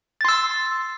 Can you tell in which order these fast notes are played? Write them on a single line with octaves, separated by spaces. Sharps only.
A6 C6 E6